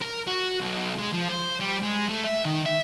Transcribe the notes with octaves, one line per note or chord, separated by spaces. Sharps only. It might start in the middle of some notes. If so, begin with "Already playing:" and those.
A#4
F#4
B1
G#3
F3
C5
G3
G#3
A3
E5
D#3
E5